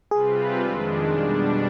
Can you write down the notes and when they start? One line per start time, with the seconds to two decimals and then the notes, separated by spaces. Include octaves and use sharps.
0.11 C3 G3 C4 F4 G#4 B4
0.60 F2 D#3 G#3 D4
1.08 B2 G3 D4